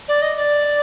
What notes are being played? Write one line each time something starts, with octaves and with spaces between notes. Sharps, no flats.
D5
D#5
D5